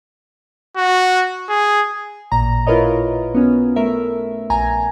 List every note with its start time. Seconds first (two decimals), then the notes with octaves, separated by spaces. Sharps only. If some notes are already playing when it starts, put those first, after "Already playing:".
0.77 F#4
1.49 G#4
2.32 A1 A#2 A#5
2.67 E4 F4 A#4 B4 C#5 D#5
3.35 B3 C#4
3.76 A3 A#4 E5
4.50 A#1 G#5 A#5